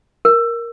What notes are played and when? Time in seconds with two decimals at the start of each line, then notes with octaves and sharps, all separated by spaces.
0.25 A#4